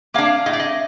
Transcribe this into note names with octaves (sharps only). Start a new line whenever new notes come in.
A#3 D4 F5
A2 D#5
D5
D#5